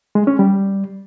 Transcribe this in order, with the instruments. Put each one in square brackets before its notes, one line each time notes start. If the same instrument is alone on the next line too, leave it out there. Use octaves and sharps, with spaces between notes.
[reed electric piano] G#3
C#4
G3